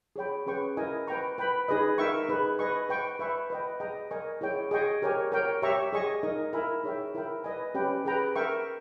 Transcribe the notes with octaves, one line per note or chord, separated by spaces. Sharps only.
G#4 C#5 G5 B5
C#4 G#4 B4 G5 C#6
E4 A#4 D#5 G#5
B4 G5 A#5 C#6
B4 G5 B5
D#4 G#4 B4 D#5
D#4 A#4 E5 G5 C#6
D#4 G#4 B4
B4 D#5 G#5 C#6
B4 G5 C#6
B4 E5 G#5 C#6
B4 D#5 G5
G#4 D#5 G5 A#5
A#4 D#5 G#5 C#6
E4 G#4 C#5 G5
G#4 D#5 G5 C#6
G4 A#4 C#5 G#5
A#4 C#5 G5
G4 C#5 E5 A#5 C#6
G#4 D#5 G#5 C#6
D#4 A#4 D#5
E4 A#4 E5 G#5 B5
D#4 G#4 C#5 E5 G5
E4 A#4 E5 G5 B5
B4 D#5 G#5
C#4 G4 B4 G5
G#4 B4 G5 A#5
A#4 E5 G5 C#6